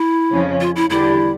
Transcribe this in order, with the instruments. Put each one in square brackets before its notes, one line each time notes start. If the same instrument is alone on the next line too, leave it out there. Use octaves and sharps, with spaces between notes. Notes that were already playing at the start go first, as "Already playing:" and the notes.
Already playing: [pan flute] E4
[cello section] F2 C#3 F3 C#4
[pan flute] F4
E4
[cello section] E2 D3 G3 D4 G4 [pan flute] E4